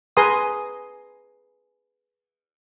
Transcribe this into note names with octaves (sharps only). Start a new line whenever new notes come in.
G#4 B4 G#5 A#5 C6 D#6